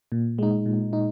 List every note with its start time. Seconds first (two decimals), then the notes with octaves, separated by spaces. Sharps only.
0.12 A#2
0.39 G#3 D#4
0.66 A#2
0.93 D#4